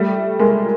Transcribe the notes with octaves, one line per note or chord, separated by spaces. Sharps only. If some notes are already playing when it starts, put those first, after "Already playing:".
Already playing: G3 A3
G#3 A#3